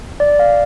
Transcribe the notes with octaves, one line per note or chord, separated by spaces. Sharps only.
D5
F5